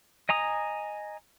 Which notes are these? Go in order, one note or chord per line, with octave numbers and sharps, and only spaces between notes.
D#5 G#5 A#5 D#6